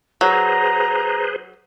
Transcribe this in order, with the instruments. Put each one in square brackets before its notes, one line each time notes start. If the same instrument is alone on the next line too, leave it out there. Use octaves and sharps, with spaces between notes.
[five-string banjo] F#3 [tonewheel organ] G#4 B4 C5 [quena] A#5